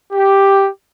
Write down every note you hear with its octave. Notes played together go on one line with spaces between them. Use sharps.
G4